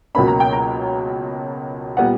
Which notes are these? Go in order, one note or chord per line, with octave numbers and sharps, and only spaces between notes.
C#2 B2 F#3 A#3 C#4 B5
A#5
G5
A#5
A#2 G3 B3 F#5